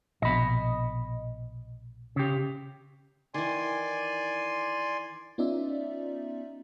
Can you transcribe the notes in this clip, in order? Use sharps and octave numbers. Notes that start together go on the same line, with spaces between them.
A#1 B2 D#5 B5
C#3 G4
D#3 E3 D5 G#5 C6
B3 C#4 D#4 F4 D5 E5